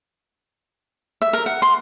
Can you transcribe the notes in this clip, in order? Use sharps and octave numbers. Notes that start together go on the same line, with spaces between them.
E5
A#4
F#5
C6